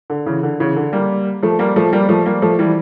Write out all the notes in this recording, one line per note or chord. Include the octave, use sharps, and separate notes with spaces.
D3
C#3 E3
D3
C#3 E3
D3
G3 A#3
F3 A3
G3 A#3
F3 A3
G3 A#3
F3 A3
G3 A#3
F3 A3
E3 G3